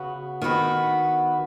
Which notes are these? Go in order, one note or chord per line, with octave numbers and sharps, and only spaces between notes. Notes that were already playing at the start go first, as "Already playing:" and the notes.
Already playing: C#3 B3 F#4
D#3 B3 F#4 B4